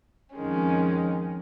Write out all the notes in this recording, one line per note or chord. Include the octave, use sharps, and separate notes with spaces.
F2 D#3 G#3 C#4